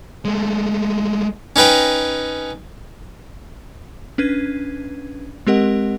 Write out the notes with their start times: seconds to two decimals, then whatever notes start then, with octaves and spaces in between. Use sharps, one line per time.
0.25 G#3 A3
1.56 C#4 D#4 B4 G5 A#5
4.18 C#4 D4 B4 G#6 D#7
5.47 G#3 C4 G4 A#4 D#5 F#5